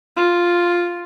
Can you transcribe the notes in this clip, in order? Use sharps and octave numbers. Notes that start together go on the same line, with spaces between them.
F4